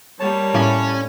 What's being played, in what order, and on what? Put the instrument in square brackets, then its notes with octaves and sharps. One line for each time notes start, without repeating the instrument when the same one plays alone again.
[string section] G3 A#3 [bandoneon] C#5 A5
[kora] A2 D5 F5 [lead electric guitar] C#4